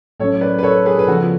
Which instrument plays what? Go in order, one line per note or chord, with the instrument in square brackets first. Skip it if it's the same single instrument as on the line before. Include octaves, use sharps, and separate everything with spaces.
[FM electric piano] A2 F#3 C#4 [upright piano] A4 C#5
[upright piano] B4 D5
B4
A4 C#5
G#4 B4
B4
[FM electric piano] C#3 F3 B3 F4 [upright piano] F#4 A4